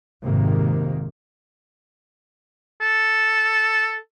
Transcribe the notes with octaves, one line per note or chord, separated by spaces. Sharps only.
G#1 F2 G#2 C3 D#3 A#3
A4